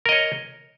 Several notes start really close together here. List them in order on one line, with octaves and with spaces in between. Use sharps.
A#4 D#5 C#5